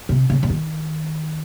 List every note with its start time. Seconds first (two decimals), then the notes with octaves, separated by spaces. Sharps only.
0.09 C3
0.30 C#3
0.43 C#3
0.50 D#3